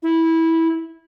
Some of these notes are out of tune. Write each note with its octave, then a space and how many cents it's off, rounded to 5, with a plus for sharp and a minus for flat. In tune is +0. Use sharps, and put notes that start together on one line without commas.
E4 -15